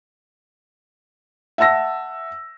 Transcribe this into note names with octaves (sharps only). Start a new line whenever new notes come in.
E5 F#5 A5 E6 A#6